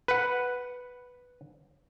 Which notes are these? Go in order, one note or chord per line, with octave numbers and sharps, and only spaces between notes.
B4 F#5